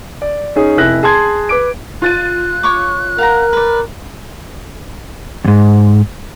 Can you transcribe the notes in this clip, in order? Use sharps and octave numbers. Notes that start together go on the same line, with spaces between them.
D5
C#4 D#4 G#4
F1 E4 F#6 A#6
G#4 A5 C6 G#6
B4 D6 D7
F4 F#6 A6 D#7
C#5 C#6 D6
A#4 F5 F#5 A#5
B4 D5
E2 G#2